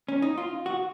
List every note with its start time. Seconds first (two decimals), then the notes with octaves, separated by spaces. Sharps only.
0.08 C#4
0.22 D#4
0.38 F4
0.66 F#4